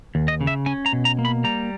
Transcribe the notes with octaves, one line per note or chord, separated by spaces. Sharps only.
D#2
D#5
C#3
E5
C#4 G#5
A#5
B2
A#5
A#3
B5
G3 A#5